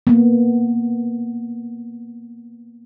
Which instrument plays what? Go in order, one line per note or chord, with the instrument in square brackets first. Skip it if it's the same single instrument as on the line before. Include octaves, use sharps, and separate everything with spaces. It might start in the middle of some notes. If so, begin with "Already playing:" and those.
[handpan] A#3 B3